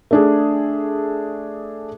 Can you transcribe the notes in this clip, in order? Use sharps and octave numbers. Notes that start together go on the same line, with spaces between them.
A3 D4 G#4